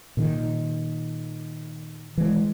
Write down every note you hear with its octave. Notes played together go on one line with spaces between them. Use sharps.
A#2 D#3
E3 G#3